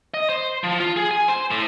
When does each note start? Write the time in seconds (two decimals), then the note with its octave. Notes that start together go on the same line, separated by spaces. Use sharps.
0.14 D#5
0.29 C5
0.64 F3
0.80 F4
0.97 G#4
1.11 G#5
1.28 C5
1.51 A2